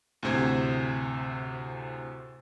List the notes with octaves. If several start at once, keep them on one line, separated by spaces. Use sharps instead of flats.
D2 A2 C3 C5 G#6